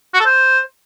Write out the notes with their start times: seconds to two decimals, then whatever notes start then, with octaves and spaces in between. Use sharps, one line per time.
0.14 F#4
0.20 A4
0.26 C5